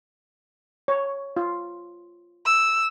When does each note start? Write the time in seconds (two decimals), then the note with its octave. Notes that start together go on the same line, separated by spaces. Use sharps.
0.88 C#5
1.37 F4
2.46 E6